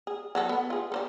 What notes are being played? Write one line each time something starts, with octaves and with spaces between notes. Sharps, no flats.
G#4
F#3 F#4 A4
B3
F4 G#4
A4 C5 D5